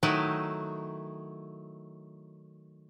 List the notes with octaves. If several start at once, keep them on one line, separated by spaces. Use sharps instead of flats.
D#3 F#3 A3 D#4 E4